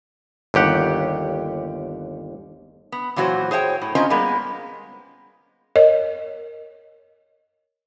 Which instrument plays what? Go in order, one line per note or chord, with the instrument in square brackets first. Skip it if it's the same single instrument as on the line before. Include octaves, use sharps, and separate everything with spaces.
[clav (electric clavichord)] G1 D#2 G4 F#5
[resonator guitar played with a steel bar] B3
A#2 E3 F#3 F4 F#4 C5
G#4 C5 C#5 F#5 G5
A2
C4 C#4 F4 C5 D#5 A#5
G3 G#3 A#3 B3
[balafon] A#4 C#5 D#5